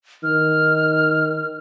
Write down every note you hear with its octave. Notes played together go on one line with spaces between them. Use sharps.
D#3 F6